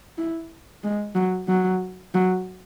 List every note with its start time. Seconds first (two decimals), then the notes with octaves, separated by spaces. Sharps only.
0.18 E4
0.84 G#3
1.15 F#3
1.48 F#3
2.14 F#3